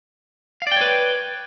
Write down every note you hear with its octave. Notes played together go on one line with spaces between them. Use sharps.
B4 C#5 D5 F5 G5